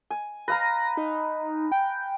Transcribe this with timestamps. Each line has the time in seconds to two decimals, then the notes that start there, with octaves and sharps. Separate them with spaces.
0.11 G#5
0.48 B4 F5 A#5 A#6
0.97 D#4
1.72 G5